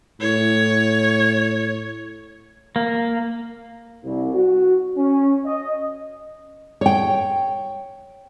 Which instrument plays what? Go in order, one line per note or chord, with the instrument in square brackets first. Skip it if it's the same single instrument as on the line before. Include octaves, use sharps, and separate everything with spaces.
[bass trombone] A2 [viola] C#5
[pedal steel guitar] A#3
[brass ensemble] C2
F#4
C#4
D#5
[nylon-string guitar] C#5 G5